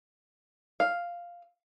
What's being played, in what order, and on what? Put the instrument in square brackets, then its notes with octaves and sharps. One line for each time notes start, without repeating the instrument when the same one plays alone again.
[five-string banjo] F5